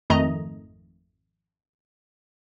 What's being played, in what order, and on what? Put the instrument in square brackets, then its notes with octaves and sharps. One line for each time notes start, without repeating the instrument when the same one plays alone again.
[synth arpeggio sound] G#1 F2 D#3 A3 D#5 A#5